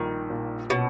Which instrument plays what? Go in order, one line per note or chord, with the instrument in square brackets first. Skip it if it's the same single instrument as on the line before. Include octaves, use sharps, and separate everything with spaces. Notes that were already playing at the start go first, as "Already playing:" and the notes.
Already playing: [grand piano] A#1 G3 [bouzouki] D#3
[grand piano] A#2
[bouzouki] B2 [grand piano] C#4